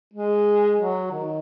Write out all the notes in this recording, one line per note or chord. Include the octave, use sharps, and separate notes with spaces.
G#3
F#3
D#3